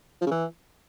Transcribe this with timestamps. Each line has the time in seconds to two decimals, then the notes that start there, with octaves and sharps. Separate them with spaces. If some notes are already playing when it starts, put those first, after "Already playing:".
0.21 F3
0.26 C#3
0.31 E3